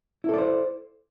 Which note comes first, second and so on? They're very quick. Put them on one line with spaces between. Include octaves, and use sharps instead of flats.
E4 A4 D5 C5